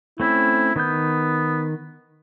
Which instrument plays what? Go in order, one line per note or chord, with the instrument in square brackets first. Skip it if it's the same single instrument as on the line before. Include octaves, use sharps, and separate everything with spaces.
[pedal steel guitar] A3 C4 C#4 [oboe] E4
[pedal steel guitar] D#3 G6 [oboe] B3